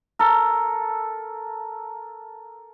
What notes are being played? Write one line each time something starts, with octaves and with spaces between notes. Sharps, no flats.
A4 A#4